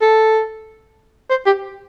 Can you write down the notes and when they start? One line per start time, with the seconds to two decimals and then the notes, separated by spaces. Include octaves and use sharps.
0.02 A4
1.30 C5
1.46 G4